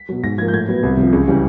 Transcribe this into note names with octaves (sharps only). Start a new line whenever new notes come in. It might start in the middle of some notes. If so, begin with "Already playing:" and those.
Already playing: B6
B2 F#3
G#2 A#6
F3 A#3 G#6
G6
A2 G#6
F#3 B3
C2
C3 F3
C#2
C#3 E3 G3